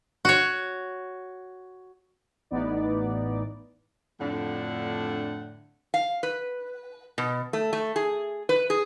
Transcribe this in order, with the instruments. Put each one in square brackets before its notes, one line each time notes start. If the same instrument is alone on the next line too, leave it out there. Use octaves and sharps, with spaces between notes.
[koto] F#4 C#5
[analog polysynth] A1 E3 B3 D#4 D5
[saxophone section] F2 A2 D3 D4 F#5
[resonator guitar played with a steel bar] F5
B4
B2
A3
A3
G#4
B4
G#4